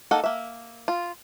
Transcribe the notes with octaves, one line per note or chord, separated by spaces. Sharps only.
A#3 D#4 A4 F#5
A#3 E5
F4